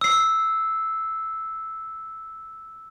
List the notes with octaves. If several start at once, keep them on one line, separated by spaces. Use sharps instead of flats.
E6 C7